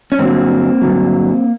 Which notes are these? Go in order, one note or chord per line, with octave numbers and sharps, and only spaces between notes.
C#4
G2 D3 F#3 A#3 C4
G2 D3 F#3